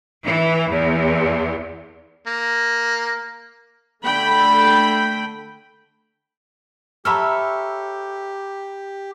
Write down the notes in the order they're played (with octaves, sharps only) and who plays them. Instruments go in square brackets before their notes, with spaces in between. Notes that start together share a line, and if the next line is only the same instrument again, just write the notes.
[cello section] E3
E2
[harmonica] A#3
[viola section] D3 A3 G5 B5
[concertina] G4 [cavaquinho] A4 C#5 E5 [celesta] A#5 B5 F6